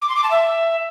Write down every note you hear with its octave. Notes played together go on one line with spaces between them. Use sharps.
D6
C6
D6
A5
E5